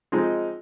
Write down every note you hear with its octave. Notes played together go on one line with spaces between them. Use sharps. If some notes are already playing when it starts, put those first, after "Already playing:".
F3 G#3 C4 D#4